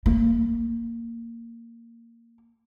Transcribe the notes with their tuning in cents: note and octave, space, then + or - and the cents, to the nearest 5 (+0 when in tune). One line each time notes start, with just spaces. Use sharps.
A#3 -10